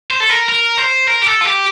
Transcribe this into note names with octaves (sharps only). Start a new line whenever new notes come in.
C5
A4
A#4
A#4
C5
A#4
G4
A4
F4
G4